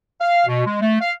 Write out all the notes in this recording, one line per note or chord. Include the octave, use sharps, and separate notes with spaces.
F5
B2
G#3
A3
F5